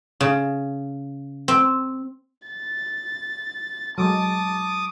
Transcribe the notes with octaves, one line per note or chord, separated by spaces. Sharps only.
C#3
C4
A6
F#3 G#3 A5 D6 D#6